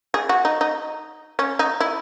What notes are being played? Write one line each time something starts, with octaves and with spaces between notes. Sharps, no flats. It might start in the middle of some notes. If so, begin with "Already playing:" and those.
G#4
F#4
D#4
D#4
C#4
D#4
E4